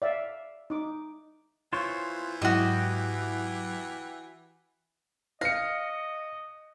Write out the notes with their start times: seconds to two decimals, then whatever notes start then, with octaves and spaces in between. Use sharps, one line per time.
0.02 D5 E5 F5
0.70 D#4 D6
1.73 E3 F4 C5 C#5
2.42 G#2 F#3 E4 F#4 G4 D#5
5.41 D#5 F5 A#6 C#7